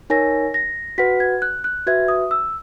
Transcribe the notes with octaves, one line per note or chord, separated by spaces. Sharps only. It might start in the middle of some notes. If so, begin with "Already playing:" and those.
D#4 A#4 C#5 G#5 A#6
A#6
F#4 B4 F#5 B6
G#6
F#6
F#6
F#4 B4 E5 G#6
D#6
E6